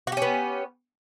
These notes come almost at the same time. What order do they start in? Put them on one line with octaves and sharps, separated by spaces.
F#4 G4 C#4 B3